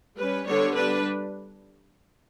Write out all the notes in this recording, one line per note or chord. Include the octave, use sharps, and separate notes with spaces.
G3 C#4 B4
D3 G3 B3 D4 C#5
G3 D4 B4